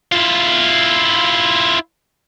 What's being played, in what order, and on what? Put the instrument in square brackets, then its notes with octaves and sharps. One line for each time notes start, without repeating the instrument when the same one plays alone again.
[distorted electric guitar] E4 F4